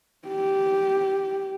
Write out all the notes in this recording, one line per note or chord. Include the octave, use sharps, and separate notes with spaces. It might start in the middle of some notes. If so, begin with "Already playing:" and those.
G4